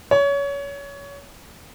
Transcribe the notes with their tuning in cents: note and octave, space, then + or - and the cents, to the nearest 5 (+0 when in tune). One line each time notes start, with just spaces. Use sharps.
C#5 +25